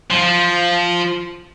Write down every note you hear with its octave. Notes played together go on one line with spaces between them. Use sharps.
F3